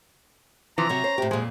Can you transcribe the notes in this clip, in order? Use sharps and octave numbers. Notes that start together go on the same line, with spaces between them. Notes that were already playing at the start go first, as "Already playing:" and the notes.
C3 E3 F3 A#5
C3 F#3 C#5
C#4 C5
A2 C3 G4
F2 A#2 G#3